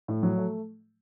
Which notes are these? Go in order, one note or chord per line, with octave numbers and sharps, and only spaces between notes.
A2
F#3
A3